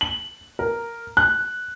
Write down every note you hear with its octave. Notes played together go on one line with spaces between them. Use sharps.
F#7
A#4
F#6